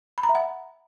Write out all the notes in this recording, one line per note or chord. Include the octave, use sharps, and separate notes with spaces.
B5
A#5
E5
F#5